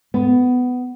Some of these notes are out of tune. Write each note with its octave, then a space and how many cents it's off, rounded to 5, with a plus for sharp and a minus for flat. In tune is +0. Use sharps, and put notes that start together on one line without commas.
B3 +15